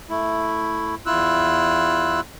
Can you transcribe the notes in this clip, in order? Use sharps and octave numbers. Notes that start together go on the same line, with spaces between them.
A3 E4
E2 E4 F4 E6 F#6